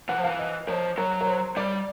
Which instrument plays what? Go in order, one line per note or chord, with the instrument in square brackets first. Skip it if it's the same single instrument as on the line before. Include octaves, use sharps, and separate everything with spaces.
[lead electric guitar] E3 [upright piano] F#5
[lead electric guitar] F3
[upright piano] F5
[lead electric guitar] E3
[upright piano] D#5
[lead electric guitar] F3 [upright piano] C#5
[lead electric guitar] F#3 [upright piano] C#5
[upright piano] C#5
C5
[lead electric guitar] G3 [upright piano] D5